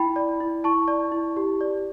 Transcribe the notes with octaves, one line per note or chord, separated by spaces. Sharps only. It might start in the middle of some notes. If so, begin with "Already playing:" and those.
Already playing: E4 G5 B5
D5
E4
E4 A5 C#6
D5
E4
G4
D5